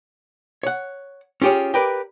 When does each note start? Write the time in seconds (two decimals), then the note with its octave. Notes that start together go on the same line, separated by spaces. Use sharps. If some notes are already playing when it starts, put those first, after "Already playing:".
0.63 C#5 F#5
1.42 C#4 F4 G4 G#4 C#5
1.74 G4 A#4 B4 D5